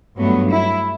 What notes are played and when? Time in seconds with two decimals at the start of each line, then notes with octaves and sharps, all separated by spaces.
0.17 G2 F#3 A3 B3
0.50 E4